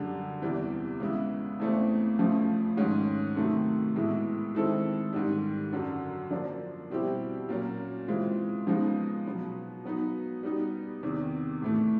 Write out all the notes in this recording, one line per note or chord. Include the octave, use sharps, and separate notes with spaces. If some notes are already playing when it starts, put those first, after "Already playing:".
Already playing: F#2 D3 G3
E2 C3 E3 G3
C#3 E3 G#3 B3 E4
E2 C#3 E3 A3 C4
F2 C#3 F3 A3 C4
G#2 D#3 G#3 C#4
C3 D#3 F#3 A3
A2 E3 G#3 B3 E4
D#3 G#3 C4 E4 A4
G#2 D#3 G3
F#2 D3 F#3
F3 A#3 D4
B2 G3 C4 E4 G4
A#2 F#3 A#3 C#4
C#3 E3 G#3 C4 F4
C#3 F3 G#3 B3 D#4
B2 F#3 B3
F#3 B3 D#4
G3 B3 D#4
E2 C3 D#3
A2 E3 A3